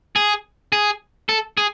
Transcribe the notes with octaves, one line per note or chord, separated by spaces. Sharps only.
G#4
G#4
A4
G#4